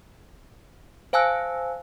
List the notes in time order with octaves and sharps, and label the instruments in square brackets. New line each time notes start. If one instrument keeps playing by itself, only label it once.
[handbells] C5 F5 G#5 A5 E6 F#6